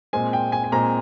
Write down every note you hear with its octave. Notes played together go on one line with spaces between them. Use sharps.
A#2 G#3 C4 G#5
G5
G#5
G#5
A#2 G#3 C4 A#5